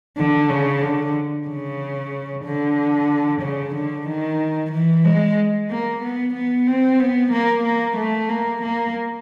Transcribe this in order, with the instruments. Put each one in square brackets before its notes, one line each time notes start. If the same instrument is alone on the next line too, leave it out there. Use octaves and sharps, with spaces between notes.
[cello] D3
C#3
D3
C#3
D3
C#3
D3
D#3
E3
G#3
A#3
B3
B3
C4
B3
A#3
A#3
A3
A#3
A#3